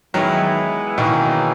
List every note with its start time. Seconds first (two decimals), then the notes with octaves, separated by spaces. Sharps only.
0.14 D#3 E3 F#3 G#3 B3 E4
0.98 F#2 B2 D#3 E3 A#3 D#4 G#4